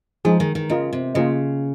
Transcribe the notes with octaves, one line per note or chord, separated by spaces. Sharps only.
F3 G#3 D#4 G#4
D#3
D#3
C#3 F4 A#4 D#5
C3
C#3 A#3 F4 C5 D#5